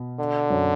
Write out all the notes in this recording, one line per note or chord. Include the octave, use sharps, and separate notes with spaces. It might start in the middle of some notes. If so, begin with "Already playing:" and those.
Already playing: B2
D3
F#2